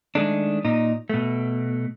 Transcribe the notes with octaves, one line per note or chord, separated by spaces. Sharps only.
D#3 G#3 A3 D4
A#2 D#4
B2 A3